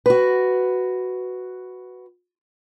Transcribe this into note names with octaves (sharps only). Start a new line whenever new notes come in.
F#4 B4